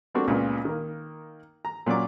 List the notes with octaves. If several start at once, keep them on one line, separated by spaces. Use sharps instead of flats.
G3 A3 A#3 C4 D4 F#4
C#2 A#2 C#3 B3
D#3 A#3
A#5
A#2 F#3 C#4 D5 D6